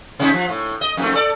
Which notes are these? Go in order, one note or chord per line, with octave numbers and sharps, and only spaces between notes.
C3 G#3 D#4
F3
A2
D#5
F2 G#2 A3
A4 D5